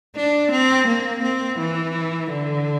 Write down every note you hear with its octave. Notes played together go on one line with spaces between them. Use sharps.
D4
C4
A#3
C4
E3
D3